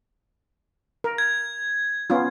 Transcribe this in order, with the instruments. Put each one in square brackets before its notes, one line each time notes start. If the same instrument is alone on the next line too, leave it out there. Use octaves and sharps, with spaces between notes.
[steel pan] A#4
[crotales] G#6
[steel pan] B3 C#4 F4